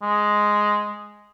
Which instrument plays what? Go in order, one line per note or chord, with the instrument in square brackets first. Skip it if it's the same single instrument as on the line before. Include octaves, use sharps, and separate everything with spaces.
[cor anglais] G#3